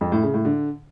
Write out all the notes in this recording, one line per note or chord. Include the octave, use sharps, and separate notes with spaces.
F2
A2
C#3
A2
D3